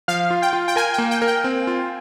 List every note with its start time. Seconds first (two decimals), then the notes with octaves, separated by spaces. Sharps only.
0.08 F3 F5
0.31 F4
0.42 G5
0.53 F4
0.68 G5
0.76 A#4 G#5
0.93 A#3 G5
1.11 G5
1.22 A#4
1.28 G5
1.44 C4
1.67 F4